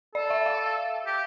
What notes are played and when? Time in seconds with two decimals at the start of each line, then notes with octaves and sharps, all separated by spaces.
0.15 A4 D5
0.30 E5
0.46 F5
1.06 G4